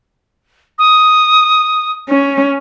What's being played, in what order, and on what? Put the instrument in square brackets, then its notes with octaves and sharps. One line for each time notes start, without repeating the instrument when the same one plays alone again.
[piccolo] D#6
[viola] C#4